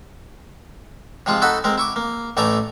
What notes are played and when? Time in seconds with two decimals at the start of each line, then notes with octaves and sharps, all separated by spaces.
1.26 C3 F3 G#3 F4
1.42 D#4 F#4 A4 D#5 F#5 B5
1.64 G#3 C4 A#4
1.78 E4 C#6 D6
1.96 A#3
2.37 A1 A3 E4 D5 G#5 A#5